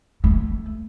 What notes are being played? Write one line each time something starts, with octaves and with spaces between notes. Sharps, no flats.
A3